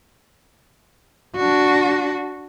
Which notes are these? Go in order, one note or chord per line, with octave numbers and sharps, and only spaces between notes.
D4 F#4